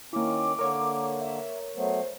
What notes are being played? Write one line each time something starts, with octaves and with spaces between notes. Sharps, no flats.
D#3 A#3 C#4 E4 D6
D3 A#3 A#4 C#5
E5
F#3 A3 B3 C5